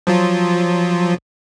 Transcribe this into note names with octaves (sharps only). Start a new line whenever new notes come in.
F3 F#3 F4